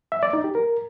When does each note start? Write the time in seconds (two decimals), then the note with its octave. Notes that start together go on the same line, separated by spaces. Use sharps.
0.12 E5
0.23 D5
0.33 D#4
0.44 G4
0.55 A#4